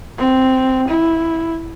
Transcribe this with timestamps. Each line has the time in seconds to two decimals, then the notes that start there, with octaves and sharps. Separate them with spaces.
0.18 C4
0.88 E4